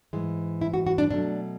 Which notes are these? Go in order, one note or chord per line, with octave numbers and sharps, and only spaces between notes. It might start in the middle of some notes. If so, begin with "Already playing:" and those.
G#2 E3 G#3
E4
F#4
F#4
D4
B2 F#3 A3 D4